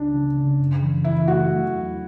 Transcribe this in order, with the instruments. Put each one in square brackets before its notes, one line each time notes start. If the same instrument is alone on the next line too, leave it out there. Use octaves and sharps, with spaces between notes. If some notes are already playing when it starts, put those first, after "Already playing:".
Already playing: [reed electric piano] C#2 C#3 [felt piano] D4
[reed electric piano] C#3
C#3
F#2
E3
[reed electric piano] E3 [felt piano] E4
[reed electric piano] A3 [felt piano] F#4
[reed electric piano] F#3
E2